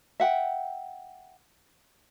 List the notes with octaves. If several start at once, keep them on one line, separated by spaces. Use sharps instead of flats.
E5 F#5 G5